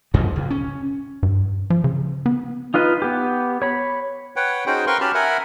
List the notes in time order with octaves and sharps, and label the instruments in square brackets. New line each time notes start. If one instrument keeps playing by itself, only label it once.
[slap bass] F2 G#2 B2 F3
C#2
C#4
[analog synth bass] G2
F3
C#3
B3
[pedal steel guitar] D#4 F4 B4 D#5
B3 G4
C#5 B5
[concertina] B4 C#5 F#5 G5
C#4 D#4 F#4 G#4 C5 G5
A#4 B4 F5 G5 C6 C#6
C#4 F#4 G4 A5 B5 F6
A#4 E5 F#5 G#5 B5